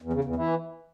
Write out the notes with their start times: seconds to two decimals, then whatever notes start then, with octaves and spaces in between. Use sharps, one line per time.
0.02 E2
0.13 C#3
0.24 E2
0.36 E3